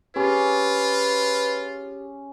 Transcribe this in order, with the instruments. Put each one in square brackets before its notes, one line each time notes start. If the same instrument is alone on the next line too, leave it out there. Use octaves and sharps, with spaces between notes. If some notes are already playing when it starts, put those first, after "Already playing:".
[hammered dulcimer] C#4 [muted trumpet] F4 [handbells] G4 G#4 [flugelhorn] B4